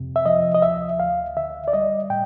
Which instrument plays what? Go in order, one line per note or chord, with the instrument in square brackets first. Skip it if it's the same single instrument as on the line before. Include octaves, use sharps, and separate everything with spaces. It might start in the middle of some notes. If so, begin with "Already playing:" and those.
Already playing: [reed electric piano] F2 C3
E5
F3 D#5
D#5
D2 E5
D2 F5
D3 E5
D5
G3 D#5
A2 G5